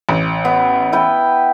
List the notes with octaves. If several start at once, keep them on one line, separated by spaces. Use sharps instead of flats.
A1
B3
E4 B4 G5